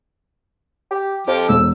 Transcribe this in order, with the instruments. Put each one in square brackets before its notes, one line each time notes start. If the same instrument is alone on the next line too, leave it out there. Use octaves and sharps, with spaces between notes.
[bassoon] G4
[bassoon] F2 [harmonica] F3 G4
[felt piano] E1 [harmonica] E6